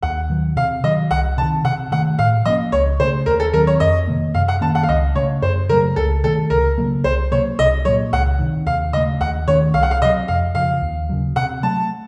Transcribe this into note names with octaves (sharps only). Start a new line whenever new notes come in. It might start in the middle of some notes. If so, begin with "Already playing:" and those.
D#2 F#5
D#3 F#3
C3 F5
D#3 F#3 D#5
C2 F#5
C3 D#3 A5
C3 F#5
D#3 A3 F#5
A2 F5
F3 A#3 C#4 D#5
C#2 C#5
C#3 A3 C5
D#2 A#4
A4
D#3 F#3 C4 A#4
C#5
F2 D#5
C3 D#3 A#3
F#2 F5
F#5
D#3 A#3 C#4 A5
F#5
F5
C#2 D#5
C#3 A3 C#5
F#2 C5
C#3 F#3 A3 A#4
C#2 A4
C3 D#3 A3 A4
C#2 A#4
C#3 F#3 A#3
C2 C5
C3 F#3 A#3 C#5
C2 D#5
A#2 F#3 C#5
C#2 F#5
C3 D#3
D#2 F5
C#3 A3 D#5
D#2 F#5
D#3 A3 C#4 C#5
C2 F5
F#5
F5
C3 F#3 D#5
F2 F5
C#3 F3 F5
D#2
C#3 F#3
C3 F#5
F#3 A3 A5